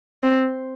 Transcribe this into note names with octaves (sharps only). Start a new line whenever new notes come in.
C4